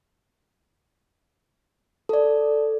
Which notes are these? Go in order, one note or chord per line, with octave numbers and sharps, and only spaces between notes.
A4 D5